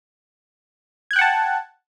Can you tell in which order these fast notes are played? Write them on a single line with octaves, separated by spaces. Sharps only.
G#6 F#6 G5 F#5 A5